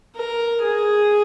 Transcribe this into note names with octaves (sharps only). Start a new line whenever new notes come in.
A#4
G#4